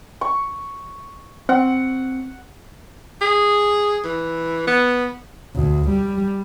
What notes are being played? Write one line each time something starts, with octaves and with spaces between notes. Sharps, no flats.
C#6
C4 F#5
G#4
E3
B3
D2
G3